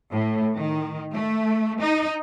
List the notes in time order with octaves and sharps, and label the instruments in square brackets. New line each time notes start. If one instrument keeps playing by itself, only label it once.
[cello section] A2
D#3
A3
D#4